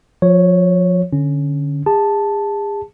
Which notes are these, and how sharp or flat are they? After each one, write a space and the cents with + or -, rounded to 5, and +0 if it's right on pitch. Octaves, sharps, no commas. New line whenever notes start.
F3 +30 C#5 +0
D3 +0 C#4 +0
G#4 -35 A5 +0